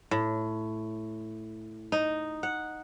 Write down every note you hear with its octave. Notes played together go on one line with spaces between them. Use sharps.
A2
D#4
F#5